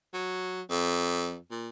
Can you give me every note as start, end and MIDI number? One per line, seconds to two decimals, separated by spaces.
0.14 0.61 54
0.70 1.37 41
1.51 1.69 46